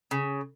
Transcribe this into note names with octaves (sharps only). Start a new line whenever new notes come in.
C#3